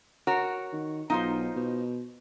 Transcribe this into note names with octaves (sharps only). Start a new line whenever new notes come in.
F#4 A#4 C#5
D#3
B1 D#4 F4 C5
B2